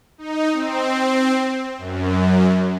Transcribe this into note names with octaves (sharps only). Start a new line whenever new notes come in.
D#4
C4
F#2